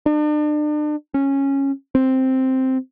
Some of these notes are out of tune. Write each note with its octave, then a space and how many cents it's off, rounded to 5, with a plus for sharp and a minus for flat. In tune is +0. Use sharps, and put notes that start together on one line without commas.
D4 +40
C#4 -10
C4 +0